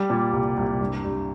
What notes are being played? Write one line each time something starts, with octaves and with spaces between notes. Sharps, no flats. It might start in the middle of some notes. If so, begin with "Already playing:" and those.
Already playing: G3
A#2
C2
C2
G2
G2